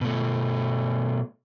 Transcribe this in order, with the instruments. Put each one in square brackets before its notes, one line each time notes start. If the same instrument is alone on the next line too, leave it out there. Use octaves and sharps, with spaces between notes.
[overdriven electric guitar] B2 A3